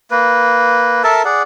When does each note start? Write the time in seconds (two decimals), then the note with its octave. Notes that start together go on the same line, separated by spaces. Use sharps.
0.11 A#3 B4
1.04 A4 A#4 E5 A5
1.25 G#4 D5 F#5